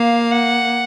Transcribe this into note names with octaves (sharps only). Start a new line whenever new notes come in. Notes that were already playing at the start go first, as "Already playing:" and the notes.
Already playing: A#3 F5
F#5